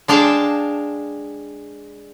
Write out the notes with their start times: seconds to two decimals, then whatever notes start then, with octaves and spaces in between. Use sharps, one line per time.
0.08 G#3 D4 F5 G5 A5